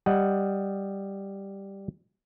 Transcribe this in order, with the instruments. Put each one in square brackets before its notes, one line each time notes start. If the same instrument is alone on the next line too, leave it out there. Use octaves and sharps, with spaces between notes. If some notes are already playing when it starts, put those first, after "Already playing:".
[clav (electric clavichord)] G3 D#5 F#5